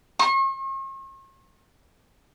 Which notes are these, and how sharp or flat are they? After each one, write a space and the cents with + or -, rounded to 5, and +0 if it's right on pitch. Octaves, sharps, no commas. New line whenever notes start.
C#6 -45